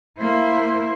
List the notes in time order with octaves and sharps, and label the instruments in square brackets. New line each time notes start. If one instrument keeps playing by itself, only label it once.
[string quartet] A#3 [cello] E4 C5